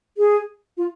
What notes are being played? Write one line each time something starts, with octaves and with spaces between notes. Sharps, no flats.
G#4
F4